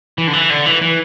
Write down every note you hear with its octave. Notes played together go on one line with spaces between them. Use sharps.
E3
D3
E3
D3
E3
E3